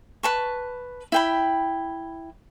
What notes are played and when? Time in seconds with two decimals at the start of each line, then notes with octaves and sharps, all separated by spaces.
0.23 B4 A5 C#6
1.12 E4 G5 B5